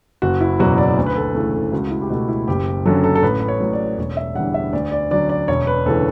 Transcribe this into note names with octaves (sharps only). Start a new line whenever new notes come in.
F#1 F#4
E4
E2 B2 F#3 F#4
D5
D2
B4
A4
C#3 E3 A3
A4
C#2 F#4
E4
G4
B2 A3 F#4
E4
F#1 G4
F#2 D3 F#3 A4
A4
A4
A1 B4
B4
C#5
A2 F#3
D5
E1 C#5
E5
E2 D3 G3 F#5
E5
D2 D5
D5
D3 F#3 D5
D5
E1 C#5
B4
D2 C#3 E3 A4